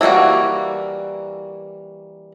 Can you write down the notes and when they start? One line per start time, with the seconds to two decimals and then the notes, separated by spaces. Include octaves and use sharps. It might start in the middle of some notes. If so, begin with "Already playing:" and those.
0.01 E3 G3 A3 A#3 F#4